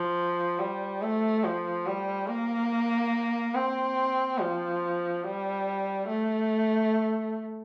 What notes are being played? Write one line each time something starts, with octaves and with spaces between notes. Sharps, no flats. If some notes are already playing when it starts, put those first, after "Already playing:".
Already playing: F3
G3
A3
F3
G3
A#3
C4
F3
G3
A3